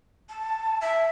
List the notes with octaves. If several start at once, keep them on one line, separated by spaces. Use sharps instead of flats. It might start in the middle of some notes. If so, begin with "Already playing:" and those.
A5
E5